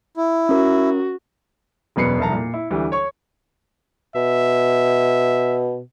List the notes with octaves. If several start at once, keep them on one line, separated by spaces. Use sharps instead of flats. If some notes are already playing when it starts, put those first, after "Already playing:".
E4
C#4 F#4 A#4
E1 F#2 B2 B4 C7 C#7
F1 C2 A5 A#5
A#2
E4
D2 E3 G3
C#5 C#6
B2 E5